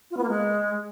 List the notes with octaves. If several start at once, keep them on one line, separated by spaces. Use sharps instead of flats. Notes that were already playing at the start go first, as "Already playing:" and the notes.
F4
B3
A#3
G#3